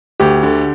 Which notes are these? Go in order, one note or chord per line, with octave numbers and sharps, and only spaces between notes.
D2 G4
D3